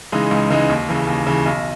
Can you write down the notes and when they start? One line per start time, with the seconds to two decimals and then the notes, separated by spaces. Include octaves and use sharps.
0.12 C#3 E3 G#3 D#4
0.31 C#2
0.50 C#3 E3 G#3 D#4
0.69 D#2
0.89 C#3 E3
1.07 D#2
1.27 C#3 E3
1.46 B1